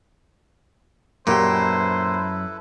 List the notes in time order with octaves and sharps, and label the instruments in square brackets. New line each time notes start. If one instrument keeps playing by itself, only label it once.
[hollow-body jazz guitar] F#2 G4 [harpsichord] A#2 [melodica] E4 A4 B4 [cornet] C5